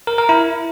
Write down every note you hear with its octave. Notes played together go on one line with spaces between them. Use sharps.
A#4
A#4
E4